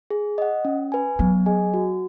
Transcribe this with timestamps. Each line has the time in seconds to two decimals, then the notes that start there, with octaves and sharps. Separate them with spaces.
0.10 G#4
0.38 D#5 F#5
0.65 C#4
0.92 B4 G#5
1.19 F#3 B3
1.46 G#4 D#5 G#5
1.74 F#4